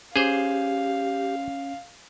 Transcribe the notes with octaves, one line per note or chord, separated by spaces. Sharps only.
C#4 G4 G#4 C5 F5